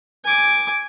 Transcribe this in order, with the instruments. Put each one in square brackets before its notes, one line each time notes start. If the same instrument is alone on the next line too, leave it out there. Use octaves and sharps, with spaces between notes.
[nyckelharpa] G#5 D6